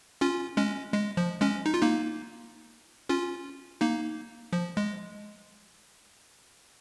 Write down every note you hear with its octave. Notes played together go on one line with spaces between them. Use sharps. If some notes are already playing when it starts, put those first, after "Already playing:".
C#4 F4
G#3 C#4
G#3
F3
G#3 C#4
D#4
F4
A#3 D#4
C#4 F4
A#3 D#4
F3
G#3